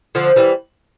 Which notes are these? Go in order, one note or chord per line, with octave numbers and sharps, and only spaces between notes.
D3 F3
E3 G3